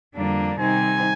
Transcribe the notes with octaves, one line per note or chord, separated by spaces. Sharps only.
F2 D3 G3 A#3 D4
C3 D#3 G3 C4 D#4 G#5